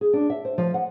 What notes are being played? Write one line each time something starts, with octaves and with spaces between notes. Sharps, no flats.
G#4
D4
E5
C5
F3
F#5